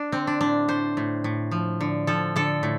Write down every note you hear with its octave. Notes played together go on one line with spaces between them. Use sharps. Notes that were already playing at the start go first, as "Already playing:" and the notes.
Already playing: D4
D3 C4
D4
A2 D4
A2 C5
A2
A2
F3
D3
F3 A4
D3 A4
A2